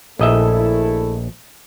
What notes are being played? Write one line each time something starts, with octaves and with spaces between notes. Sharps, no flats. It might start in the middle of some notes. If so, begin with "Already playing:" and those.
A#1 A3 E4 A4 D#5 E5